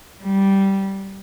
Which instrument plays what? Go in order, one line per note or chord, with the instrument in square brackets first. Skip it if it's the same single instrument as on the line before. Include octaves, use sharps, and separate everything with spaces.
[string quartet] G3